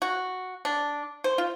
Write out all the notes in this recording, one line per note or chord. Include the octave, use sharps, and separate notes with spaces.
F#4
D4
C5
F4